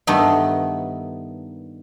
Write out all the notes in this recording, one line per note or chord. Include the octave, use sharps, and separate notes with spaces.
G2 D#3 A3 B3 D#4